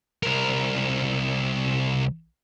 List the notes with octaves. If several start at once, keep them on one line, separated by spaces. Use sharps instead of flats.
C2 A#4